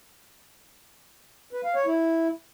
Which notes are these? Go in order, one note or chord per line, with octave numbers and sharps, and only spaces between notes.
B4
F5
C#5
E4